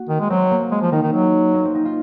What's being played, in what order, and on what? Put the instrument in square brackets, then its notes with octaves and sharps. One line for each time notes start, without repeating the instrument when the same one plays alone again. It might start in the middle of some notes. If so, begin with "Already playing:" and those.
Already playing: [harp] A#3 F#4
[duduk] D#3
G#3
[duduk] F#3 [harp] C4
[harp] A#3
[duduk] G#3 [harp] C#4
[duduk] F3
[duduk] D#3 [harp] D#4
[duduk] D#3
F#3
[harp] A#3
C4
D#4
F4